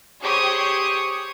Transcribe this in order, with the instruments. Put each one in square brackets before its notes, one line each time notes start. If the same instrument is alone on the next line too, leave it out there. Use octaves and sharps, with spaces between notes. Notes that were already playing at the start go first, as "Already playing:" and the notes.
[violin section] G4 G#4 C5 C#5 C#6 D#6